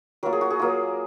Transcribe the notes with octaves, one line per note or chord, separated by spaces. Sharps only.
F#3 A#3 F4 A#4
G#4
F#4
G#4
F#3 A#3 F4